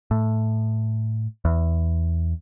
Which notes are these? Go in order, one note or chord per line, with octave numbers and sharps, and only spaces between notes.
A2
E2